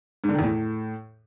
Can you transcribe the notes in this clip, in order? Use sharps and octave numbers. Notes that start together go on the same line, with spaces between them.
G#2
D3
D#3
E2
A2